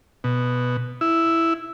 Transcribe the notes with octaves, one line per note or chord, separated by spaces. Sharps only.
B2
E4